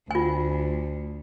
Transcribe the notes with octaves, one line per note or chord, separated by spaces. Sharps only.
D2 F4 G#5